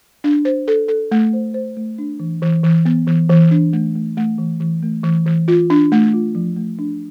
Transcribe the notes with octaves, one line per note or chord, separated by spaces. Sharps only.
D4
C5
A4
A4
A3
C5
C5
A3
D4
E3
E3
E3
B3
E3
E3
D4
A3
A3
A3
E3
E3
A3
E3
E3
F4
D4
A3
F4
F3
A3
D4